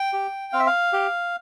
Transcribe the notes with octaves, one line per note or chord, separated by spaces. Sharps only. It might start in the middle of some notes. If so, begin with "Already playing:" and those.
Already playing: G5
G4
C4 F5
E5
F5
G4